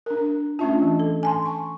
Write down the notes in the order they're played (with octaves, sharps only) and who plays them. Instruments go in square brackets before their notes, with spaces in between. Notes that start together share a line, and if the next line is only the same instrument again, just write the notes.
[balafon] D4 A#4
[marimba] A3 D4 F4 [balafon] C#4 E5 A5
[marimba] E3
A4
G#5 A5 C6
[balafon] C#6